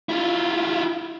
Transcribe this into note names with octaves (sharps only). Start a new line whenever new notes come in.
E4 F4